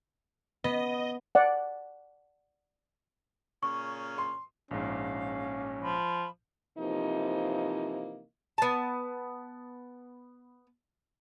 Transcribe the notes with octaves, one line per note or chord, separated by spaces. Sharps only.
B3 D#5
D5 F#5
A#2 C#3 C#4 C#6
C6
A#1 G#2 C#4 F5
F3 B5
C3 E3 F3 A#3 D#4
B3 A5